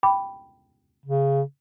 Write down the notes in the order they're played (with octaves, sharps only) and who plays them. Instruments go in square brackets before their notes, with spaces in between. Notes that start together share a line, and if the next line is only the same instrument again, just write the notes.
[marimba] G5 B5 D6
[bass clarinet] C#3